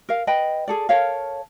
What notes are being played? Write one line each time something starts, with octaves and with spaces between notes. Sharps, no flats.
A#4 F5
B4 D#5 G5 B5
G#4 A4 D5
A4 A#4 C#5 F5